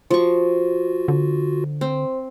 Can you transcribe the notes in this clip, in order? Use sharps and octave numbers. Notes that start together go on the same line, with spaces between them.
F3 F4 F#4 C#6
D3
C4